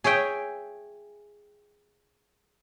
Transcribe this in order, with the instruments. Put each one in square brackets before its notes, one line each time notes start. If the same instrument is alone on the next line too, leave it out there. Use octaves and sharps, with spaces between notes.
[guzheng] G#4 C#5 E5 G5